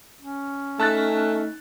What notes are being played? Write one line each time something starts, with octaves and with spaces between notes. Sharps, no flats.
C#4
A3 D#4 A5 F#6 A6